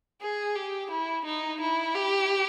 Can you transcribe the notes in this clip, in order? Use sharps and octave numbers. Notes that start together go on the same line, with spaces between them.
G#4
G4
E4
D#4
E4
G4